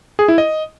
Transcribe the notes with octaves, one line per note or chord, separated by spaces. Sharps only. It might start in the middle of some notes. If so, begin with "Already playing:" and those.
G#4
E4
D#5